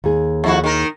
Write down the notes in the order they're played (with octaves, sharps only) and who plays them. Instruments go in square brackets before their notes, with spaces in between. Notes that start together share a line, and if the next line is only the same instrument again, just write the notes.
[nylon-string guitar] D#2 G#4
[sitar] F2 E4 F#4
D#3 A#4